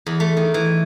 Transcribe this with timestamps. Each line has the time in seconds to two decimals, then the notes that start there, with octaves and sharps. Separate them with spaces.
0.07 E2
0.20 A3
0.37 D#3
0.54 E3